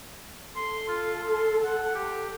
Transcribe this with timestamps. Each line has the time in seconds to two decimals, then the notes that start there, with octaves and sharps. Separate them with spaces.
0.56 A4 C6
0.88 F4
1.32 C6
1.63 F#5
1.95 G4